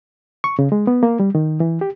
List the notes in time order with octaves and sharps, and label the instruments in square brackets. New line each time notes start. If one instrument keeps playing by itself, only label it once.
[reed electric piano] C#6
C#3
G#3
B3
A#3
G3
D#3
E3
G4